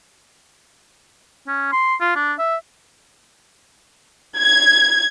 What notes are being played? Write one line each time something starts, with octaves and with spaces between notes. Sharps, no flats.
C#4
C6
F4
D4
E5
G#6